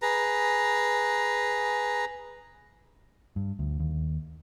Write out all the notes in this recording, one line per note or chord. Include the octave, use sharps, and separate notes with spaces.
G#4 B4 A#5
G2
D2
D#2